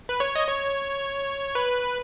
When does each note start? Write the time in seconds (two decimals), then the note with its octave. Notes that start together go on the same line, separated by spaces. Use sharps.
0.09 B4
0.20 C#5
0.36 D#5
0.47 C#5
1.55 B4